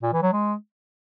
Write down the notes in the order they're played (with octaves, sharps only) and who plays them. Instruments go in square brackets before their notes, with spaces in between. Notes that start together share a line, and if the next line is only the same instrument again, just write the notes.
[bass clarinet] A#2
E3
F#3
G#3